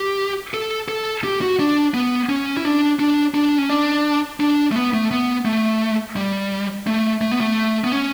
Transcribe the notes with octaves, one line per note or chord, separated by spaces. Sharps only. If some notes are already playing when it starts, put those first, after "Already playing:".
Already playing: G4
A4
A4
G4
F#4
D4
B3
C#4
E4
D4
D4
D4
C#4
D4
D4
A3
B3
A3
B3
A3
G3
A3
A3
B3
A3
B3
C#4